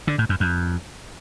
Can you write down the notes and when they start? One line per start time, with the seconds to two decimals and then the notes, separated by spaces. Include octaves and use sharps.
0.07 D3
0.18 A2
0.29 F#2
0.40 F2